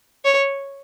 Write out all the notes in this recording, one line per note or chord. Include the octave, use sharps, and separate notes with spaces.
C#5